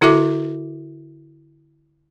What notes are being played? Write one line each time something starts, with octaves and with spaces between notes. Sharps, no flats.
D3 E4 F#4 A4 E5 D6